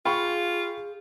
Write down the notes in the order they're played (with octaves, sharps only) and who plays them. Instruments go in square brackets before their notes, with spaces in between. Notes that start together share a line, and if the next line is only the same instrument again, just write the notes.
[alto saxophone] F4 [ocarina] G#4 [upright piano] G5 B5 C#6